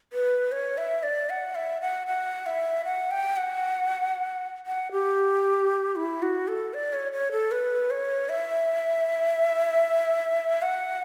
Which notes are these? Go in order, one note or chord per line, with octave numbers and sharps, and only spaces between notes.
B4
C#5
E5
D5
F#5
E5
F#5
F#5
E5
F#5
G5
F#5
F#5
G4
E4
F#4
A4
D5
C#5
C#5
A4
B4
C#5
E5
F#5